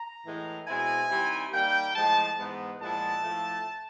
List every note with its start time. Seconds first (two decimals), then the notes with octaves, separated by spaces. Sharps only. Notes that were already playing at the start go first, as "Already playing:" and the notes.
Already playing: A#5
0.25 A2 E3 G#3
0.67 B2 G#3 C4 E4 G#5
1.10 D#3 G3 C4 E4
1.53 D#3 G3 A#3 G5
1.95 A2 F3 G#3 A5
2.38 G#2 E3 G#3 B3
2.80 A#2 F3 G#3 B3 E4 A5
3.24 A2 F3 A3